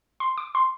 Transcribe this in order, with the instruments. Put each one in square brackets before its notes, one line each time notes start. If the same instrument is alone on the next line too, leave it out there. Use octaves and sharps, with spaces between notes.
[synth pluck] C6
D6
C6